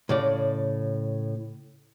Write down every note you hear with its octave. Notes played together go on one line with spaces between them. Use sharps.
A2 C#3 D5